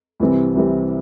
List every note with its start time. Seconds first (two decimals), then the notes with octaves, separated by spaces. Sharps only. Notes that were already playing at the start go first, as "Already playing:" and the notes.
0.20 C2 C3 E3 G3 C4
0.55 C2 C3 E3 G3 C4